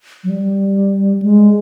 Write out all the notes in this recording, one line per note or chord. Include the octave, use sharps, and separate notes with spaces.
F#3
G3
G#3